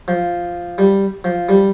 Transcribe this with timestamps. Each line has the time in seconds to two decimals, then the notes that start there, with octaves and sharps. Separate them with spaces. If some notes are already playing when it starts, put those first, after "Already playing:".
0.08 F3
0.78 G3
1.24 F3
1.49 G3